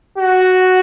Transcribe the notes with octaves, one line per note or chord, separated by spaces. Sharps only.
F#4